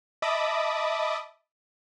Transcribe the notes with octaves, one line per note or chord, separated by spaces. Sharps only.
D#5 E5 A5 B5 D6 D#6